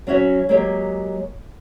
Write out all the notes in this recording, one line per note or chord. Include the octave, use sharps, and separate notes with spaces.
F#3 C#4 F#4 C#5 E5
F#3 G#3 A#3 G4